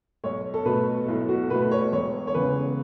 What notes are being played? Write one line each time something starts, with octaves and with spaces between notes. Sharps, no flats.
B1 C#5
A4
B2 A3 B4
B1 E4
F#4
B2 A3 B4
B4
C#5
E1 C#5
C#5
E2 C#3 B4